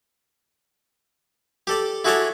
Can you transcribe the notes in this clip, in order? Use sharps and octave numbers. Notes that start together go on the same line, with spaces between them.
G4 A4 D5
E4 F#4 G#4 A4 C#5 D5